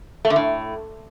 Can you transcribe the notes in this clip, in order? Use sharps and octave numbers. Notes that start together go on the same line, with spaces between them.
A3
D3
A2